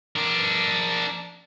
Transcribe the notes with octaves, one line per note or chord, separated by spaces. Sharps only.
D4 A#4